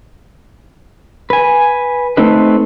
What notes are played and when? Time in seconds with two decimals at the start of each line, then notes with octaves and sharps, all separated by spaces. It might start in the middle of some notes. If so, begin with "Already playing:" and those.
1.30 B4 G#5
2.17 A3 C4 D#4 B4